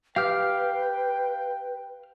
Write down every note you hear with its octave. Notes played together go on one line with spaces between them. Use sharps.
G4 B4 F5 G5 F6